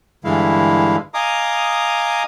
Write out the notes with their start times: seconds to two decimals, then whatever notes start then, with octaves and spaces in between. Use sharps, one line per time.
0.24 G2 D3 E3 G#3 E4 F5
1.14 D#5 F5 G#5 A#5 D6 D#6